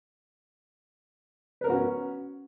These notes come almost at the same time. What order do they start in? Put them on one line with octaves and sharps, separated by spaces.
B4 A#4 B3 F#4 C#4